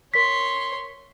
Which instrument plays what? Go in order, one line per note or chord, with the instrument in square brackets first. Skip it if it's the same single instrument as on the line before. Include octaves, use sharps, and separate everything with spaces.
[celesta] A#4 B6 [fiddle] C#5 C6